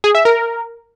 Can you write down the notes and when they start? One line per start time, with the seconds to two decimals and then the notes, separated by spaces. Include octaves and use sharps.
0.04 G#4
0.15 E5
0.25 A#4